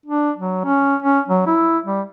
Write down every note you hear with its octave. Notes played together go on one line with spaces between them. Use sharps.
D4
F#3
C#4
C#4
F#3
E4
G3